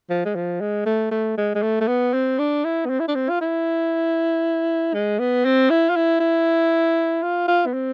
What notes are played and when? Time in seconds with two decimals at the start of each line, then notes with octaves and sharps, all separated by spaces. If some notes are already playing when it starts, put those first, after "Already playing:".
0.10 F3
0.25 G#3
0.35 F3
0.61 G#3
0.86 A3
1.11 A3
1.37 G#3
1.55 G#3
1.62 A3
1.81 A3
1.88 B3
2.13 C4
2.39 D4
2.64 E4
2.85 B3
2.90 C4
3.00 E4
3.08 D4
3.15 C4
3.29 F4
3.41 E4
4.94 G#3
5.19 B3
5.45 C4
5.70 E4
5.90 F4
5.96 E4
6.20 E4
7.23 F4
7.48 F4
7.66 B3
7.74 C4